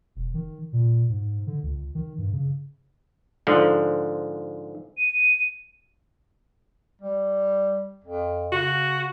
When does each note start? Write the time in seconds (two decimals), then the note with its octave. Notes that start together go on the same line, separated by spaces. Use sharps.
0.16 E1
0.34 D#3
0.73 A#2
1.09 G#2
1.47 D3
1.63 C#2
1.95 D#3
2.18 G2
2.33 C#3
3.47 G#2 D3 F3
4.98 D#7
7.02 G3
8.04 F2
8.52 C#3 F#4